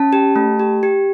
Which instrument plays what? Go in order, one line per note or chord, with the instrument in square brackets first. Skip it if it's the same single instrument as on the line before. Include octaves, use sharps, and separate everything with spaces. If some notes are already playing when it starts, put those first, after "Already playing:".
Already playing: [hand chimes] C#4 A5
G4
A3
G4
G4